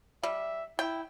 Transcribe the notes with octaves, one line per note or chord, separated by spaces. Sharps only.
G3 E5
E4 G5